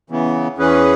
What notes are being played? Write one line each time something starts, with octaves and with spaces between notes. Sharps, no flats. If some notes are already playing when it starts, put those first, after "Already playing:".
C#3 E3 B3
E2 E3 C#4 G#4 B4